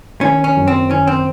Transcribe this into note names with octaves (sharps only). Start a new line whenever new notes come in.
D#3 C#4
C#4
F#2
C4
D#3 C#4
C4